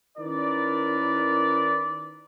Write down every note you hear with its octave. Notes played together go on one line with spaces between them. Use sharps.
D#3 C#4 E4 A#4 B4 D5